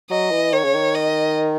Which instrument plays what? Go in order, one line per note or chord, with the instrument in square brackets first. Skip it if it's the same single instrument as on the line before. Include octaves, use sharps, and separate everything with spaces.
[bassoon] F#3 [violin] D#5
[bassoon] E3
[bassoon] D#3 [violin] C#5
[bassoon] C#3
D#3
[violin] D#5